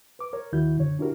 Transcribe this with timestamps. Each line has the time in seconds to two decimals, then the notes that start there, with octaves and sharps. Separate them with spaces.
0.19 B4 D6
0.33 A#4 C#5
0.52 D#2 D#3 E4 F#4 G6
0.78 F#2 D3 C#5
0.99 D4 E4 F#4 G4 A#4